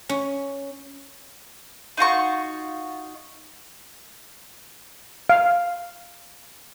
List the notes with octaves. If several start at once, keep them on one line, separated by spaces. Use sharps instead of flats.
C#4
D#4 F4 F#4 C#6
F5